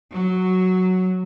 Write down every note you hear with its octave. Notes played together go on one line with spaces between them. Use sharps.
F#3